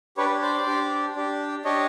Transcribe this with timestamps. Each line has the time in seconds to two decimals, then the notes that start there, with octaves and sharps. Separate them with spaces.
0.17 D4 G4 B4 C#5
0.42 C5 D5
0.66 D4 G4
1.16 D4 G4
1.65 D4 G4 C#5 D#5